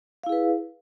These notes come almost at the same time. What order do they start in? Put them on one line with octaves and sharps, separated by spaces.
F5 E4 G#4 B4